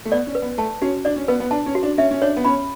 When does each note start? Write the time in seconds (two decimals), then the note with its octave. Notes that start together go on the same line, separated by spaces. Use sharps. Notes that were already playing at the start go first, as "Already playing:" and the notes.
0.05 A3
0.12 B3 D5
0.27 C#4
0.35 B4
0.42 B3
0.58 A3 A5
0.82 C#4 F#4
1.05 D4 D5
1.16 C#4
1.28 B3 B4
1.40 B3
1.51 D4 A5
1.66 C#4
1.75 F#4
1.83 D4
1.98 C#4 E5
2.11 C#4
2.22 D4 C#5
2.37 B3
2.45 C#4 B5